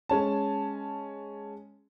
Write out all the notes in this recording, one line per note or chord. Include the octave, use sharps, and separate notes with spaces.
G#3 C#4 A5